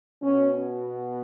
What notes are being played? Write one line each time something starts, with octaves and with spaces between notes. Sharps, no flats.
B2 C#4